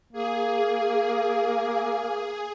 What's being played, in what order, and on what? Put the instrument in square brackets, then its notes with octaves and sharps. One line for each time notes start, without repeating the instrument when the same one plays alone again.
[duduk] A#3 [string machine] G#4